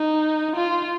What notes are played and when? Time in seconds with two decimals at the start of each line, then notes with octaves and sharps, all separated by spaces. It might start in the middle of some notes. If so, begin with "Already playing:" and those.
Already playing: D#4
0.55 F4